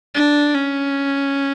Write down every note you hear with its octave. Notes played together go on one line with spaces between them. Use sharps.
D4
C#4